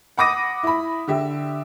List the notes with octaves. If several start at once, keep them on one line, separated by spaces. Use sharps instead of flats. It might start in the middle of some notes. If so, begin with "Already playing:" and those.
F#5 B5 D6 D#6 A#6 D#7
E4 B5
D3 G4 E5